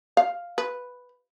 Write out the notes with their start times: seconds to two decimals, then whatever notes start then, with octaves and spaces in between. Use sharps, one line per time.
0.17 F5
0.58 B4